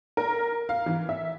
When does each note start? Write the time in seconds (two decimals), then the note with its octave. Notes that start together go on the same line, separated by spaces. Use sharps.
0.17 A#4
0.69 F5
0.86 E3
1.09 E5